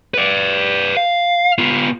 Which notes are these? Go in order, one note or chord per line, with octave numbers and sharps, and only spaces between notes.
B4 D5
F5
B3 F4